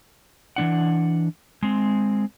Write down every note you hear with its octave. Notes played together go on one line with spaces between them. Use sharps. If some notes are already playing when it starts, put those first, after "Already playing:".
E3 G#3 D4 F#5
G#3 C4